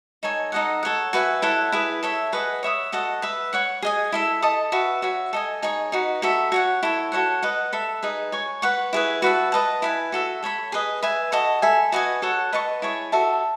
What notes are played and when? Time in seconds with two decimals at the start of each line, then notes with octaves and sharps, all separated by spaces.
0.23 D#4 A4 C#5 G#5
0.52 D#4 A4 D#5 F#5
0.83 A4 C#5 F#5
1.13 F#4 B4 E5 G#5
1.42 E4 A4 C#5 F#5
1.72 E4 G#4 B4
2.03 A4 C#5 E5
2.32 G#4 B4 D#5 F#5
2.63 C#5 E5 B5 D#6
2.92 F#4 A4 D#5 F#5
3.22 B4 E5 B5
3.53 C#5 F#5 C#6
3.82 G#4 D#5 G#5
4.12 E4 A4 E5
4.42 A4 D#5 A5 D#6
4.72 F#4 B4 E5 B5
5.02 F#4 C#5 E5
5.33 A4 D#5 G#5
5.62 D#4 G#4 C#5
5.92 D#4 F#4 B4
6.22 F#4 A4 E5 B5
6.52 F#4 C#5 F#5
6.83 E4 A4 C#5
7.12 F#4 A4 C#5 F#5
7.43 B4 D#5 F#5
7.73 A4 E5 B5
8.03 D#4 G#4 B4
8.32 C#5 G#5 C#6
8.62 B4 F#5 C#6
8.93 E4 G#4 B4
9.22 F#4 B4 E5 A5
9.52 B4 D#5 A5
9.82 E4 B4 E5 G#5
10.12 F#4 A4 E5
10.43 A4 C#5 E5 B5
10.72 G#4 B4 D#5
11.03 B4 E5 G#5
11.32 F#4 A4 D#5
11.62 A4 E5 G#5 B5
11.92 F#4 B4 D#5 G#5
12.22 F#4 A4 C#5 F#5
12.53 B4 D#5 A5 C#6
12.82 E4 G#4 C#5
13.12 F#4 A4 E5 A5